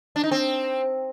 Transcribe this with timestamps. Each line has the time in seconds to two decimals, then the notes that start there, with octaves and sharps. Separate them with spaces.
0.16 D4
0.24 D#4
0.31 C4